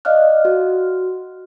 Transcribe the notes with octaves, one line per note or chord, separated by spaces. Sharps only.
D5 D#5 F5 F6 F#6
F#4